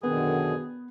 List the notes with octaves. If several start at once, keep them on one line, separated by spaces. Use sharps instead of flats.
F#2 B2 D3 D#3 B3 G#4